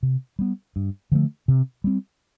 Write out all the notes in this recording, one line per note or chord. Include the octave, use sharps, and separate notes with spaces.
C3
G3 B3
G2
D3 F3 A3
C3
G3 C4